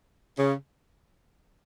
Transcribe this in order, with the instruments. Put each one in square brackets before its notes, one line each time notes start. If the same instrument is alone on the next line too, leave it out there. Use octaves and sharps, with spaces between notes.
[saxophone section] C#3